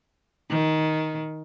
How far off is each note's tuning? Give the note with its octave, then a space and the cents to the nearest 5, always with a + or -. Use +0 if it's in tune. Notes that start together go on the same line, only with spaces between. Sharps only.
D#3 +10